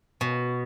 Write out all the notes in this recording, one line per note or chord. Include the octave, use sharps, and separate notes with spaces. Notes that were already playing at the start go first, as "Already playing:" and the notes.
B2